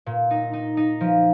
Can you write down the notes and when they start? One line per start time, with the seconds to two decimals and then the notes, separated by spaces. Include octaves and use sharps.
0.06 A#2
0.31 D#4
0.53 D#4
0.77 D#4
1.01 F3